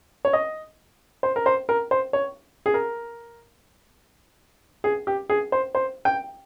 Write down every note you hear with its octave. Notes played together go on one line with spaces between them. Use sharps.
C#5
D#5
C5
A#4
C5
A#4
C5
C#5
G#4
A#4
G#4
G4
G#4
C5
C5
G5